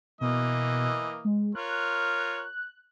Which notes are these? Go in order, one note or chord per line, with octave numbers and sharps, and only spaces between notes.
B2 E3 A#3 D#5
G#3
F4 A#4 C#5 F#6